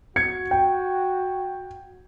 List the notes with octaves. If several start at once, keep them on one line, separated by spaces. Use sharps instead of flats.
F#4 G#6 C#7
G5